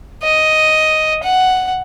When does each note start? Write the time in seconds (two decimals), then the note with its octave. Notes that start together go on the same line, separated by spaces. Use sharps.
0.23 D#5
1.23 F#5